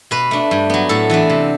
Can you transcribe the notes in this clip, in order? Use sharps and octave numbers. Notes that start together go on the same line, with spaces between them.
B2 B4
A3 D4
G2
F#3 B3
A2 A4
E3 B3 D4
C3